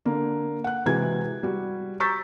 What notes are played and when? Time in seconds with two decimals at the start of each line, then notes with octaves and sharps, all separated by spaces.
0.05 D3 A#3
0.64 F#5 F#6
0.86 C3 E3 G#3 F#4 G#6
1.43 G3 F#4
2.00 A#5 C#6 E6 G6 A6 B6